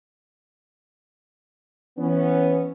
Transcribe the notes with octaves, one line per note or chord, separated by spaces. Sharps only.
E3 B3 C#4